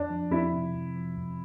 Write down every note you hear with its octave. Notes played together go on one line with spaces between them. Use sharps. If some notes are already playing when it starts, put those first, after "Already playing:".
Already playing: F2 D4
F3
F2 E4
C3
F2
F3
F2